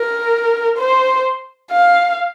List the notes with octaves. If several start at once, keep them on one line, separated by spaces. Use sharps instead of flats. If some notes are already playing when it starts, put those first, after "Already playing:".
Already playing: A#4
C5
F5